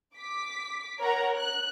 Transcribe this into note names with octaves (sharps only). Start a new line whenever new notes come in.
D6 B6
A#4 C#5 F#5 A#5
F#6